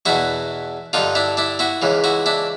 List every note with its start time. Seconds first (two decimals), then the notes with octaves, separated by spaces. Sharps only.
0.06 E2 B2 E4 F#4
0.93 G2 D3 D#4 F4
1.15 D4 E4
1.37 D4 E4
1.59 E4 F#4
1.82 C#2 C#3 E3
2.04 E4 F#4
2.26 D4 E4